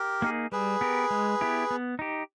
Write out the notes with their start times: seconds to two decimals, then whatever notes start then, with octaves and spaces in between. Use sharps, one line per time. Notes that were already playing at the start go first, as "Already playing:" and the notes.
Already playing: G4 A#4
0.22 A#3 D#4 G#4
0.52 G3 G#4 B4
0.81 B3 G4 A#4
1.11 G#3
1.41 B3 E4 G4
1.71 B3
1.99 D#4 G4